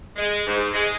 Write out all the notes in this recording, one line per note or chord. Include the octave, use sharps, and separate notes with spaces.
G#3
G#2
G#3